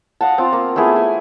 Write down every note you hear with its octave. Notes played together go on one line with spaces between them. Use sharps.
D#5 F5 F#5 A5
C4 F4
A#3
A3 B3 E4 G#4
G#5